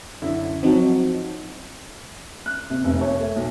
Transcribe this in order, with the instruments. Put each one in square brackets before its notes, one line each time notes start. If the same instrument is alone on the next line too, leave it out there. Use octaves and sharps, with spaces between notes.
[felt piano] F#2 D3 E4
[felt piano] F3 F#3 [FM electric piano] C4 D#4 F#4
[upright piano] F#6
C3
F1
C#5
A3
B1